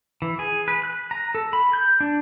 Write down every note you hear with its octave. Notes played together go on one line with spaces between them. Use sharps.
E3
G#4
B4
F#6
A#5
A4
B5
G6
D4